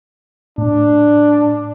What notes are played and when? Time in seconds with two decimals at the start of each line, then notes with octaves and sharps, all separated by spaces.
0.58 A2 D4